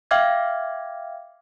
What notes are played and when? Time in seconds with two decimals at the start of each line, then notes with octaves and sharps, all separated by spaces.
0.11 E5 F5 G5 D6 F6 G#6